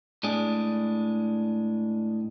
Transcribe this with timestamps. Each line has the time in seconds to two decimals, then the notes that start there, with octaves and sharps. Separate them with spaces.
0.23 A2 G#3 D4 G#4